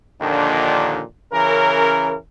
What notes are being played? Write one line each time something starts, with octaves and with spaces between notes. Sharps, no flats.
D#2 A#2 D3 D#3 F3 D4
C#3 E3 C#4 A#4